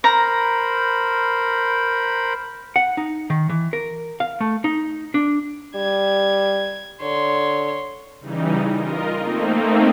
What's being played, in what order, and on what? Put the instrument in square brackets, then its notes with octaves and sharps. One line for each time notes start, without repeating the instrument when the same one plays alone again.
[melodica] A#4 C5 B5 [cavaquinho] A#5
[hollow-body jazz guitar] F#5
D#4
D#3
E3
A#4
F5
A3
D#4
D4
[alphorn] G3 [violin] G#6
[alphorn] D3 [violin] C#5 C6
[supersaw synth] C#3 E3 G3 D#4
F4 A#4 D#5
A3 A#3 C4 D#4